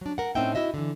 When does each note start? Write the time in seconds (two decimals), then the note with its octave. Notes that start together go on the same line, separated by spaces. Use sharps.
0.01 F#3 D4
0.18 A#4 F#5
0.35 A2 C4 C#4 D#4 E5 G5
0.55 E4 F#4 D#5 E5
0.74 D3 E3